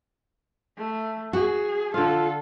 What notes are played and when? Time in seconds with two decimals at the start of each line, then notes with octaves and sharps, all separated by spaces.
0.78 A3
1.33 F#4 G#4
1.94 D3 F4 A4 F5